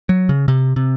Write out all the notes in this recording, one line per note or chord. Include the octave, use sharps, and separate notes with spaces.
F#3
C#3
C3
C3